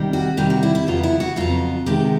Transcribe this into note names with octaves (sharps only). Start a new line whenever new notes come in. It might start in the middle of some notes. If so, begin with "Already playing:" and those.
Already playing: C3 D#3 G3
F#4
C3 D#3 G3 G4
F#4
E4
E4
F2 C#3 F#3 B3 F4
E4
F#4
F2 C#3 F#3 B3 F4
C3 D#3 G#3 B3 G4